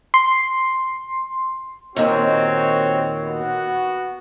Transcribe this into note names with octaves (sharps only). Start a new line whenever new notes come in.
C6
D#2 A#2 D#3 C4 F#4 C#5
B3 F#4